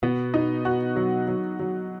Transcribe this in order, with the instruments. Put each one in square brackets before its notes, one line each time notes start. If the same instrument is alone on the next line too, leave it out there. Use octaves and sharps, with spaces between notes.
[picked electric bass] B2 [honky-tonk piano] B3
[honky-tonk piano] D#4
F#4
F#3
F#3
F#3